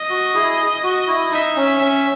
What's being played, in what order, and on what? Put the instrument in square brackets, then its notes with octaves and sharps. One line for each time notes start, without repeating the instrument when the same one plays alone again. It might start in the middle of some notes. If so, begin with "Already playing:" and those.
Already playing: [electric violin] D#5
[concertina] F#4
E4 G#4
F#4
E4
[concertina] D#4 [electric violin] E5
[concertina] C#4
C#4